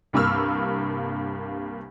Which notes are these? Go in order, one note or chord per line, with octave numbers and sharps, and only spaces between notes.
C2 G2 A#3 C#6 E6 F6